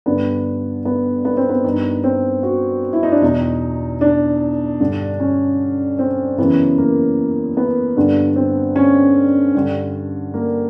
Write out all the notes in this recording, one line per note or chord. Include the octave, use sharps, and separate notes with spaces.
G2 D3 B3
B3
B3
C4
B3
G2 D#3
C4
F#4
E4
D#4
D4
E2 B2 D#4
D4
G2 D3
C#4
C4
F#2 C#3 E3 B3
A#3
B3
G2 D3
C4
C#4
G2 D3
A#3